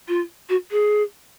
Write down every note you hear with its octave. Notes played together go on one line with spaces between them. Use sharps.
F4
F#4
G#4